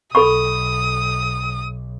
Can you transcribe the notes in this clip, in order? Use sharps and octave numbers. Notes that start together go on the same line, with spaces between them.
B1 A4 B5 C#6 D#6